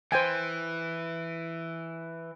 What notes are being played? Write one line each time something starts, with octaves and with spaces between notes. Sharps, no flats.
E3 C5 G5 G#5